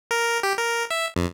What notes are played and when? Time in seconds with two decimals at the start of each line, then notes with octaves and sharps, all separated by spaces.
0.11 A#4
0.43 G4
0.58 A#4
0.90 E5
1.16 F2